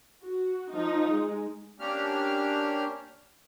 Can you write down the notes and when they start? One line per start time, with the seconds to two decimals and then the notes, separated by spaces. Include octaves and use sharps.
0.24 F#4
0.73 F3 D#4
1.11 G#3
1.80 A#3 C#4 D4 G4 F6